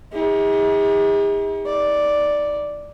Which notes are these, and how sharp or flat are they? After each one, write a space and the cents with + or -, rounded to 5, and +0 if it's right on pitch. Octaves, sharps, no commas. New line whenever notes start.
D#4 +45 G#4 -45
D#4 +40 D5 +0